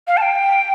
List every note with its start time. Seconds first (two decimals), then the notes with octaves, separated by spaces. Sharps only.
0.07 F5
0.17 A5
0.21 G5